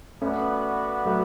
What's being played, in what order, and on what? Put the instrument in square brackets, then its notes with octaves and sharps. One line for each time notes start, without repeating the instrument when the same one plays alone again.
[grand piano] A3 C#4 [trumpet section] B3 F#4 B4 D5
[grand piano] F#3 A3